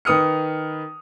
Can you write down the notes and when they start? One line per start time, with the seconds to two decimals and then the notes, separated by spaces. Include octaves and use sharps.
0.05 D#3 B4 D#6 F6 C#7